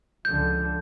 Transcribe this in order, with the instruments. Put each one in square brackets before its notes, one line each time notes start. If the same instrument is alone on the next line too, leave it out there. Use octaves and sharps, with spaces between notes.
[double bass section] C#2 D3 F3 [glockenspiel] G6